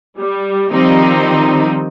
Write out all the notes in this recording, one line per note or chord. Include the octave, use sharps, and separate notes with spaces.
G3
D#3 F3 G3 C4 D#4